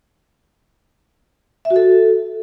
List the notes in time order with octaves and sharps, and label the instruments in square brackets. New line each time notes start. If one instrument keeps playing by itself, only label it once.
[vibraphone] E5
F#4
A4